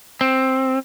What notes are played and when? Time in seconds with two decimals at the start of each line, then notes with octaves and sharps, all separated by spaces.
0.21 C4